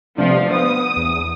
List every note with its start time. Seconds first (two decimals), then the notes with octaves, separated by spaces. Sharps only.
0.18 C3 F3 A3 D4
0.51 B3 C5 D#6
0.97 E2